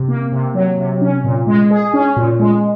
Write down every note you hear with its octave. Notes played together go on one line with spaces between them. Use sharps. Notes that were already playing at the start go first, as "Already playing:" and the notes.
Already playing: C3
A#3
C3
F#3
C3
C#4
A#2
G#3
G#4
C#4
A#2
G#3